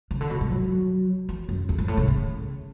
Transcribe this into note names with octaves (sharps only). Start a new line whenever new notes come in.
C#3
D3
B2
G#2
F#3
E3
F#2
E2
G#2
A2
C#3
C#3